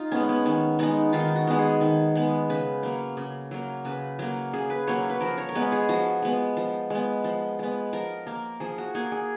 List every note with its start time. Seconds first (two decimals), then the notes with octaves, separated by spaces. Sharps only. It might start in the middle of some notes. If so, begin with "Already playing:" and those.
Already playing: D#4 F4
0.12 G#3 B3 C#4
0.29 B3
0.45 D#3 C#4
0.79 G#3 B3 D#4
1.13 D#3 F4
1.36 F#4
1.47 G#3 B3
1.59 G#4
1.81 D#3
2.15 G#3 B3
2.50 C#3 B4
2.83 F#3 A#3
3.17 C#3
3.51 F#3 A#3
3.85 C#3 B4
4.19 F#3 A#3
4.53 C#3 G#4
4.70 B4
4.87 F#3 A#3 C#5
5.10 B4
5.21 F3 A#4
5.38 C#5
5.49 A#4
5.55 G#3 B3 B4
5.72 G#4
5.89 F3 F#4
6.22 G#3 B3
6.57 F3
6.90 G#3 B3
7.24 F3
7.59 G#3 B3
7.93 F3 A#4
8.27 A#3 A#4
8.60 F3 G#4
8.78 F#4
8.95 A#3 G#4
9.12 G#4